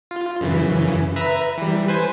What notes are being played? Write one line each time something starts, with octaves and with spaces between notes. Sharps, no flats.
F4
F#2 C#3 E3
B4 E5 A#5
E3 G3
B4 C5 G#5